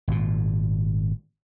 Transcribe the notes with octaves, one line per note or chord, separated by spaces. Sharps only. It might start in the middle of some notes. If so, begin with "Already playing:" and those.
G#1 A#2